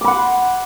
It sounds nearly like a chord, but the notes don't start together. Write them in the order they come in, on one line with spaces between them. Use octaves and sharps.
D6 B5 F#5 C6